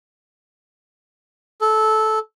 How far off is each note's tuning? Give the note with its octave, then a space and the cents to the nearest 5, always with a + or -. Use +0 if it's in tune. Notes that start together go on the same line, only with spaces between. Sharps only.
A4 -15